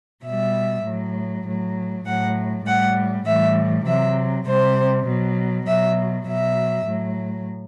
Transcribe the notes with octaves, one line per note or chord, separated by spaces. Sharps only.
B2 G3 E5
A2 F#3
A2 F#3
A2 F#3 F#5
A2 G3 F#5
A2 E3 G3 E5
C3 F#3 E5
C3 G3 C5
B2 F#3
B2 F#3 E5
B2 F#3 E5
A2 F#3